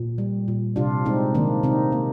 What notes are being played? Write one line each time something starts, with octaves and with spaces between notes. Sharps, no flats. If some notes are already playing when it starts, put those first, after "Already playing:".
Already playing: A#2
G3
A#2
C3 D4 F4
G#3 C4 D#4
D#3 A#3 D4
C3 C4 D#4
A#3